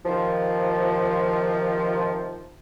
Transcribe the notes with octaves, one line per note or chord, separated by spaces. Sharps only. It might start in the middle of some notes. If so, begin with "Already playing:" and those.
C3 D#3 F3